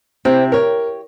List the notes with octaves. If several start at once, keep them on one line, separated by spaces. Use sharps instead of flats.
C3 C4 E4
G4 A#4 C#5